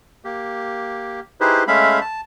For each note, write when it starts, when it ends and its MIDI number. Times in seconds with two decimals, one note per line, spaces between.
0.25 1.20 58
0.25 1.20 67
1.40 1.64 63
1.40 1.64 64
1.40 1.64 67
1.40 1.64 68
1.40 1.64 71
1.40 1.64 72
1.68 2.00 56
1.68 2.00 57
1.68 2.00 61
1.68 2.00 76
1.68 2.00 77
1.68 2.00 83
2.01 2.21 81